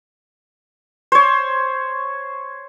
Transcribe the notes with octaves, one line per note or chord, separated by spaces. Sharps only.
C5 C#5